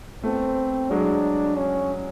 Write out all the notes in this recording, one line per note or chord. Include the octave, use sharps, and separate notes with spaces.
A3 B3 C4
F#3 G#3 D4
C#4